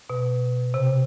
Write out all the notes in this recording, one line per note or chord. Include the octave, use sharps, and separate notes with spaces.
B2
C3